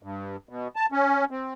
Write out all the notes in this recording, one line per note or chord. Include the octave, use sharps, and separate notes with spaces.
G2
B2
A5
C#4
C4